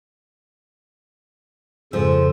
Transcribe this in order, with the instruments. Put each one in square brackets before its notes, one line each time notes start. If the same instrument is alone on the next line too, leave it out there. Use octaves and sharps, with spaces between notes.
[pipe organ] F2 C#3 A4 [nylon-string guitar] G#2 F3